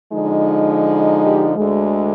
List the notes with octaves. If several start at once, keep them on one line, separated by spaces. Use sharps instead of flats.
D3 F3 G#3 D#4
G4
D2 D3 G#3